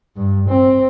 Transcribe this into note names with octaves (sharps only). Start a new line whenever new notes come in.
G2
C4